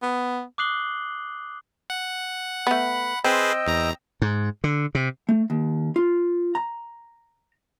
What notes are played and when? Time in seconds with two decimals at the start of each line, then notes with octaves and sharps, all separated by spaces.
0.02 B3
0.58 D6 D#6 F#6 C7 F#7 G7
1.90 F#5
2.67 A3 B3 B5
3.24 C4 G#4 B4 C5 D#5 G5 E6
3.67 E2 A#5
4.22 G#2
4.64 D3
4.95 C3
5.29 A3
5.50 D#2
5.96 F4
6.55 A#5